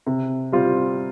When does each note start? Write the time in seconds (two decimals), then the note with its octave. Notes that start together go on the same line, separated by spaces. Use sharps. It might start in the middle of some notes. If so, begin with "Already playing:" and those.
0.06 C3
0.52 G3 C4 F4